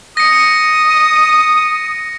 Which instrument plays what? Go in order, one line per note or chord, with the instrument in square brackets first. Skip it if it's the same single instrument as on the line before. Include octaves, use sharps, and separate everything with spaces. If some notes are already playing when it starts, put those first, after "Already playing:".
[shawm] D#6 [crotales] A#6 C#7